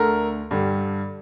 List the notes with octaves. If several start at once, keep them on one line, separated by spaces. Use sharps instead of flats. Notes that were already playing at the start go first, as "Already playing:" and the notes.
Already playing: D2 D3 A3 A#4
G2 D3 G3